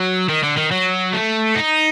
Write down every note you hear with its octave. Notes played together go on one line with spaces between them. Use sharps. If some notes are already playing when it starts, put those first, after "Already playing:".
Already playing: F#3
D#3
D3
D#3
F#3
A3
D#4